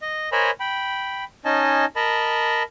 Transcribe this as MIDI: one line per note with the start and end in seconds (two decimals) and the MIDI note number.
0.02 0.29 75
0.32 0.51 70
0.32 0.51 72
0.32 0.51 73
0.32 0.51 75
0.32 0.51 80
0.32 0.51 83
0.60 1.24 79
0.60 1.24 83
1.45 1.85 61
1.45 1.85 63
1.45 1.85 75
1.45 1.85 80
1.45 1.85 81
1.96 2.63 70
1.96 2.63 75
1.96 2.63 81
1.96 2.63 83